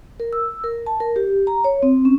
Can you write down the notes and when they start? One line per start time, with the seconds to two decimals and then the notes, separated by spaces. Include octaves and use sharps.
0.20 A#4
0.33 E6
0.64 A#4
0.87 A5
1.00 A#4
1.16 G4
1.47 A#5
1.64 C#5
1.83 C4
2.05 C#4